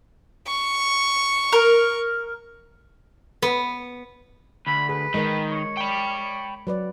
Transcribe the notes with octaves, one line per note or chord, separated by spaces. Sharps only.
C#6
A#4
B3
D2 B5
G#4 B4
D#3 G#3 A#4 D#5
C#5
G5 B5
F#3 B4 D5